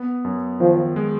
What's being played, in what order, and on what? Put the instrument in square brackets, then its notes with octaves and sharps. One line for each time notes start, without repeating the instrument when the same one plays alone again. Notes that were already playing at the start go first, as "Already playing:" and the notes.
Already playing: [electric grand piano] B3
F#2
[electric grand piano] D#3 [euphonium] F3
[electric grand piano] G#3